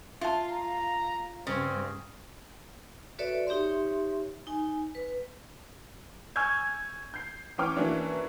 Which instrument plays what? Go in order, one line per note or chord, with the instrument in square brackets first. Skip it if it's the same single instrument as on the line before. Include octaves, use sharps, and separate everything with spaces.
[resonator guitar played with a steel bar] F4 [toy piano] E5 A5
[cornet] A#5
[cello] G2 [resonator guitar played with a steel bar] C#3 [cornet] C4
[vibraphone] F#4 A4 B4 C#5 D5 E5
D#4 G4 C#5 E5 C6
D#4 G#5
B4
[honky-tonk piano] G#5 C#6 E6 F6 G6 G#6
G6 C7
E3 C#4 G5 D6 F6
E3 F#3 A#3 C#4 D4 E4